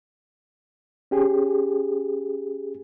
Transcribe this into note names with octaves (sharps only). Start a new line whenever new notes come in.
C#4 G4 G#4